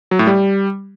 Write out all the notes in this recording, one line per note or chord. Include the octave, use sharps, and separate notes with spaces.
F#3
A2
G3